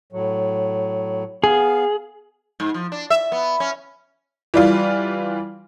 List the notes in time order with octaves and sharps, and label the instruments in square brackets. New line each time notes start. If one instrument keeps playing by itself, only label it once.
[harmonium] A2 F#3
[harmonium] B3 F5 [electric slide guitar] G#4
[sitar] G#2
F3
D4
E5
B3
C#4
[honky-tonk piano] E3 G3 F4